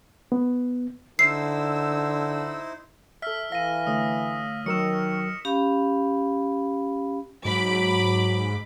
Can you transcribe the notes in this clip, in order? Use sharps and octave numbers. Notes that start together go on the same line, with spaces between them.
B3
D3 D#4 E4 C5 E6 C7
A4 E5 E6 F6 B6
E3 F5 A#6 D#7
D3 A3 C#5 D#6
D#3 F#3 A#4 C#6 E6 F6 C#7 E7
C#4 G4 F5 B5
G#2 F#3 B5 D6